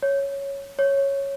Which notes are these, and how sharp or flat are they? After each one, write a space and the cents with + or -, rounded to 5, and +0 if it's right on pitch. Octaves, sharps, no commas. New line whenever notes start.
C#5 +0
C#5 -5